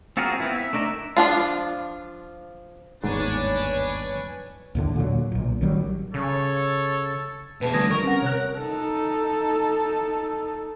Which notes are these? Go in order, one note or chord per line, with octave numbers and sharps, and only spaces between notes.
C4 F4 F#4 G#4 A#4
B3 C4 E4
E5
A3 D4 D#4 A#4 E5
F3 D4 F4
G1 D#2 G#2 D4 B4 C#5 G#5
D#2 A2 D3
A#2 D3 D#3 F#3
B1 A#2
A1 D#3 F#3 G3
C#3 A4 C#5
B2 G#4 B4 A5
D3 F3 G3 A3 D#6 G#6 A#6
A#4 C#6
C4 C#4 F#5
C3 C#5 F#6
D#4 A4